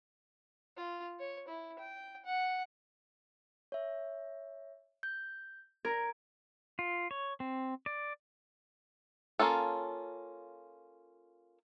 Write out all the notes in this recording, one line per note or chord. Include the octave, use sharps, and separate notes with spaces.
F4
C#5
E4
G5
F#5
C#5 E5
G6
A#4 G#6
F4
C#5
C4
D5
A#3 C#4 F4 A4